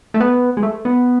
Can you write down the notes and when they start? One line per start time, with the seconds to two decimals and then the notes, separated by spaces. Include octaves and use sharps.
0.14 A3
0.20 B3
0.57 G#3
0.63 A3
0.85 B3